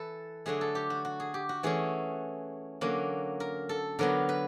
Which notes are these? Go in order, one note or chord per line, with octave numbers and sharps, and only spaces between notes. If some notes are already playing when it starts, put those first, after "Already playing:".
Already playing: E3 A4 B4
D3 F#3 A3 G#4
A4
G4
F#4
F#4
G#4
G4
F#4
E3 A3 C#4 G#4
D3 F#3 A#3 C#4
A#4
A4
D3 F#3 B3 A#4
B4